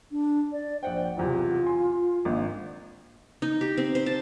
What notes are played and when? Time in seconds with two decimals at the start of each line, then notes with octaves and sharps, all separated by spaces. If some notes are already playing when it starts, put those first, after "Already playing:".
0.11 D4
0.52 D5
0.83 A#1 C5 F#5 G5
1.17 B1 E2 C3 F4
1.66 G#5 C6
2.25 G#1 A#3 D4
3.42 D#4
3.61 G4
3.77 C4
3.95 C5
4.06 A5